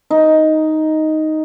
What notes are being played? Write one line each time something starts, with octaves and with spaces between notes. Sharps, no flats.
D#4